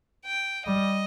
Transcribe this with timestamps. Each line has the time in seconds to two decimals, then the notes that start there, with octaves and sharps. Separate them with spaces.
0.26 G5
0.65 G3 D#5